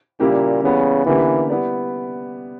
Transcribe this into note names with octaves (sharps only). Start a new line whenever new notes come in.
A#2 C#3 G3 A#3 E4 G4
C#3 E3 G3 B3
D3 E3 A#3 C#4 G4 B4
G3 B3 E4 B4 D5